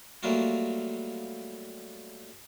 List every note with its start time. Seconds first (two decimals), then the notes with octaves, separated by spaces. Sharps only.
0.23 F#3 G3 A3 A#3 F4 F#4